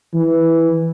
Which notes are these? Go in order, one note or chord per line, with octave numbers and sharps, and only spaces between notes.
E3